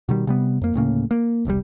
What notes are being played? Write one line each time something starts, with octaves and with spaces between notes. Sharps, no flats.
B2 D#3 G3
C3 G3 B3
F2 A#3
D1 A2 C#3 A#3
A#3
E1 C2 A#2 G3